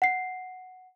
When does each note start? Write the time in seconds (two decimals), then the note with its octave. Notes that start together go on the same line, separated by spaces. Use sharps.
0.02 F#5 C7